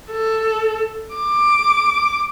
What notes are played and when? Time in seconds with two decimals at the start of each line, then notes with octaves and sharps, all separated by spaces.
0.11 A4
1.15 D6